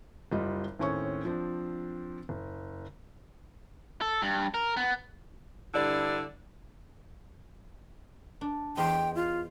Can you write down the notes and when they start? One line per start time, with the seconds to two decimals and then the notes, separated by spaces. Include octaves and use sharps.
0.32 F#1 G3 F4 D#5
0.79 D#2 A2 C4 C#4 G#5 C#6
1.25 F3 C4 D4
2.29 F#1
4.01 A4
4.22 G2
4.54 A#4
4.77 B3
5.74 G2 D3 E4 D5
8.41 D4
8.77 E2 C5 D#5 G5
9.15 F4